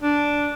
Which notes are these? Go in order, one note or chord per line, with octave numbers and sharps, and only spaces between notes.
D4